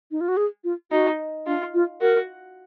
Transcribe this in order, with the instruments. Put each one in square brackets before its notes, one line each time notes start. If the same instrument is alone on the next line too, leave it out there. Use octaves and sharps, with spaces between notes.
[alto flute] D#4
F4
F#4
G#4
F4
[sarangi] D#4 [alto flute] F#4
[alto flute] D4 [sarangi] F4
[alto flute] F4
[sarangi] F#4 [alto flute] A#4